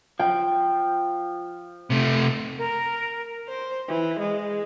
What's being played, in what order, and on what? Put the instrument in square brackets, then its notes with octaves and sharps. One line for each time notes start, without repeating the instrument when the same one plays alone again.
[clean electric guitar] F3 [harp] G5
[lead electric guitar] C3 A3
[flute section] A#4
[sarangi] C5
E3
G#3